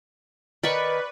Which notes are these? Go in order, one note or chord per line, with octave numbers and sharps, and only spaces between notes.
D#3 B4 D5 B5 C#6